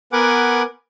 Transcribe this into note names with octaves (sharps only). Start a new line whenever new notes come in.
B3 A#4 B4 F#5 G#5 D6